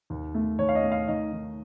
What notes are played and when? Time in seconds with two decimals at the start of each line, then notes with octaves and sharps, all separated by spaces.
0.10 D#2
0.35 A3
0.59 D#2 C#5
0.69 F5
0.75 D#5
0.83 A3
0.92 F5
1.08 D#3 D#5
1.32 D#3